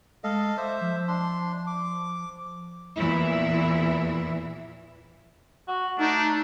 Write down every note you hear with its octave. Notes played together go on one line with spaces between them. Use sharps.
G#3 A4 D#5 F5
C5 E5 D6
F3
D4 C6
D6
E2 A#2 E3 E4
F#4
A3 D4 D#4